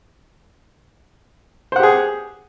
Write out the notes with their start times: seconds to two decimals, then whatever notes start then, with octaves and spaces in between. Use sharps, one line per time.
1.72 C5
1.76 F#5
1.80 G4
1.83 G#4